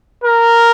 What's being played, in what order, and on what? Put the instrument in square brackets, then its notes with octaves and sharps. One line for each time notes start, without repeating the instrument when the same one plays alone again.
[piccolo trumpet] A#4